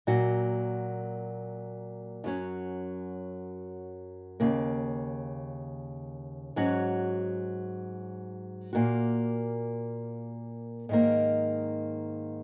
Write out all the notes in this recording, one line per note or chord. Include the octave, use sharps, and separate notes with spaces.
A#2 F#3 A#3 F#4
F#2 F#3 C#4
D#2 C#3 A#3
G#2 F#3 C#4 F#4
A#2 A#3 F#4
G#2 D#3 A#3